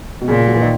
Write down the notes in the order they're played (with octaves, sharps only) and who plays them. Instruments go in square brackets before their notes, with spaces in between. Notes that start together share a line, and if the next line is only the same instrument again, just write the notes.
[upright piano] B2
[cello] A#2 [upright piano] C#3
[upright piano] F#3
E3
D#3